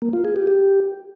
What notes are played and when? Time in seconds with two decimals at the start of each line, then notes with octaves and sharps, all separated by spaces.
0.02 A#3
0.13 F4
0.25 G#4
0.36 G4
0.47 G4